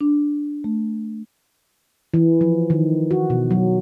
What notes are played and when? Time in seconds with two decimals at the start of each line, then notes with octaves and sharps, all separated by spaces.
0.01 D4
0.64 A3
2.14 E3
2.41 F3
2.70 D#3
3.11 F#4
3.30 B2
3.51 F#3